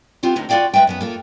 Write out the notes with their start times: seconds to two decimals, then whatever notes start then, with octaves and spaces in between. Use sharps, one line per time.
0.23 B3 C4 F4 G4
0.36 D2 A2 E3 D#4
0.49 F4 F#4 A4 D5 F5 G5
0.73 G#3 B4 E5 G5
0.87 F#2 B3 B4
1.01 A#3 F4 A4